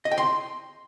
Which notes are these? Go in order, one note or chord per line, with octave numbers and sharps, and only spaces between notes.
D#5
G5
C6